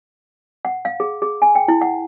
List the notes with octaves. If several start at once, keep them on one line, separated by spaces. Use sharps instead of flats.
F#5
F5
G#4
G#4
G#5
G5
E4
F#5